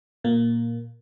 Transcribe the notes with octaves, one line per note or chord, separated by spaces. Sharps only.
A#2 A#3